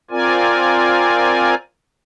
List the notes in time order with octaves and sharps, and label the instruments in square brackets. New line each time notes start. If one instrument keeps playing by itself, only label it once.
[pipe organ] C4 F4 A#4 D5 G#5